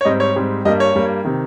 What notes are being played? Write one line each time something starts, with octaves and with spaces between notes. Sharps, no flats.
C#5
G#2 G3 C4 D#5
C#5
G#2 G3 C4
G2 G3 A#3 D#5
C#5
G2 G3 A#3
C3 D#3